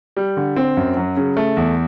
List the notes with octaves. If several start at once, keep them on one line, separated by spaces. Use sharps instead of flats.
G3
D3
C4
F#2
F#3
C#3
A3
E2